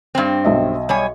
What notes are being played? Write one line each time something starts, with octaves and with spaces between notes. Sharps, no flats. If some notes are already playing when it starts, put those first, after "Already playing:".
G2 C4
B1 D#5 E5
G3 C#5 G#5